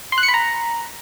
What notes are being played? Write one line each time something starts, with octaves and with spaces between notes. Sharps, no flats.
C6
F#6
C#7
B5
A#5